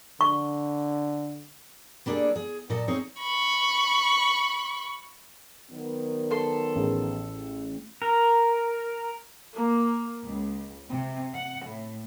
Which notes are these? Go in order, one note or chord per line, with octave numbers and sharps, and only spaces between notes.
D3 C#6
G3 A#3 D4 F4 G#4 A4
G#4
A#2 F#3 A4 D#5
C4 D#4 G#4 C#5
B5 C#6
D#3 F#3 B3
A4 C6
A1 G#4
A#4
A#3
C#2
C3
F#5
A2